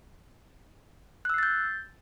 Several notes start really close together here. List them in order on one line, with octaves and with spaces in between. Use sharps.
F#6 E6 C7 A6 G6